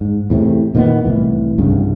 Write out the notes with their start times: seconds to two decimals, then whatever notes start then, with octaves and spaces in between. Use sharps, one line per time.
0.01 G#2
0.30 E2 A2 C3
0.75 A#2 D#3 A#3 B3
1.05 C2 A2 E3
1.58 C2 G2 C#3